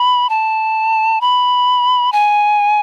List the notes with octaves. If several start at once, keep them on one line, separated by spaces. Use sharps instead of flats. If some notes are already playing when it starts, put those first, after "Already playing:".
Already playing: B5
A5
B5
G#5